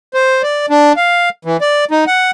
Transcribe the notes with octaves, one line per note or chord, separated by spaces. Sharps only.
C5
D5
D4
F5
E3
D5
D#4
F#5